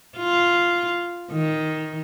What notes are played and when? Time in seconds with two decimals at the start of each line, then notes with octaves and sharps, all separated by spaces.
0.17 F4
1.31 D#3